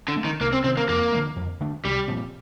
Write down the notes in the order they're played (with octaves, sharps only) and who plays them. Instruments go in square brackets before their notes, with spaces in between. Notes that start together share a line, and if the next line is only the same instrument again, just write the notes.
[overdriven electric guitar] D3
[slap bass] A3 C4
[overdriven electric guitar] D#3
[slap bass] C2 [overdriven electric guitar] A#3
[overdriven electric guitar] C4
[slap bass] C3 D#3 [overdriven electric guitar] C4
[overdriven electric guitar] A#3
[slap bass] F2 [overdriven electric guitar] A#3
[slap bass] D3 F3 A3
F2
D3 A3 D4
[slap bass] C2 [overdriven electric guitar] G3
[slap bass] A#2 F3 C4